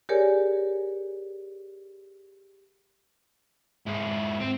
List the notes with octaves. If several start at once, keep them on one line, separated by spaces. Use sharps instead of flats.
G4 G#4 A#4 C#5 D5 G#5
G#2 E4
C4